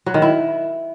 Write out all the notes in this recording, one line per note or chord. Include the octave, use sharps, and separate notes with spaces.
F#3
D#3
E4